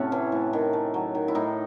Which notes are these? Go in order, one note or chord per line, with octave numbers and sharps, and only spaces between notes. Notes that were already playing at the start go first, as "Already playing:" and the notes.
Already playing: A2 C3 A3 C#4 F#4 A4
E3
A2
D#3
A3
F#3
D#3
E4
A2 D#4